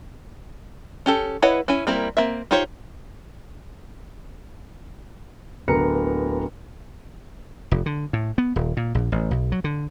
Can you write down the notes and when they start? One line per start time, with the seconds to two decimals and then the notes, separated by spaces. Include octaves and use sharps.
1.06 C#4 G4 A4
1.42 E4 B4 C#5 D#5 F#5
1.68 C#4 E4 G#5
1.87 G3 A#3 C4 E4 A#4
2.17 A#3 C4 E5
2.51 D#4 F4 G4 C5 C#5
5.68 D1 D3 B3 A#4 A#5 C#7
7.71 F1
7.86 D3
8.13 A2
8.38 B3
8.56 D#1
8.77 A#2
8.95 A#1
9.12 A1
9.31 B1
9.52 F#3
9.64 D3